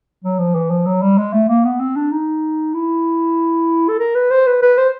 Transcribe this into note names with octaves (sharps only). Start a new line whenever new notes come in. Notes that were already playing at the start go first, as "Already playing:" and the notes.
F#3
F3
E3
F3
F#3
G3
G#3
A3
A#3
B3
C4
D4
D#4
E4
A4
A#4
B4
C5
B4
B4
C5